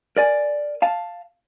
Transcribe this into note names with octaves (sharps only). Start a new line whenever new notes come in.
A#4 D5 G#5
F5 A5